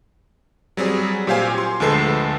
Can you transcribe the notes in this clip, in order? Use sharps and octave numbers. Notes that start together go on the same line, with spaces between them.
F#3 G3 C4 G#4
A#2 F#3 G4 C5 F5 G#5
C6
D2 F3 G#3 A4 B4 C7